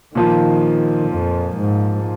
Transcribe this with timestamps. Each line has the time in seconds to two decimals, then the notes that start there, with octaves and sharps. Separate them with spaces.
0.15 A#2 D#3 F3 A#3 F4
1.10 F2
1.57 G#2